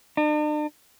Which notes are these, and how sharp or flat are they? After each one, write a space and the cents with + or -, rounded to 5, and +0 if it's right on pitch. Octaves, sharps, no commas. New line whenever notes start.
D4 +45